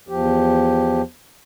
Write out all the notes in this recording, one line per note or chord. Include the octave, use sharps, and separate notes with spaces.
E2 F3 G4